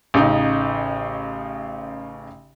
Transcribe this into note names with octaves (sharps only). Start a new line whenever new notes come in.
A1 C#3 D#4